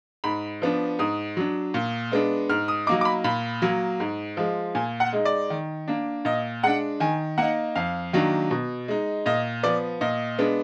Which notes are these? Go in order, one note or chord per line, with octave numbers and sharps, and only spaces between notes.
G#2 B5
F3 B3 D4
G#2 D#6
F#3 D4
A#2
G#3 B3 D4
G#2 F6
D#6
F#3 A#3 D#4 D6
D6
B5
A#2 B5
F#3 A#3
G#2
F3 G#3
A#2 G#5
F#5
G#3 D#4
D5
D#3
A#3 D4
A#2 D#5
G#3 D4 F#5
D#3 G#5
A#3 D#4 F#5
F2 F5
D#3 F#3 A#3 D4
B2
G#3 D#4
A#2 D#5
F3 B3 D5
A#2 D#5
G#3 B3 D4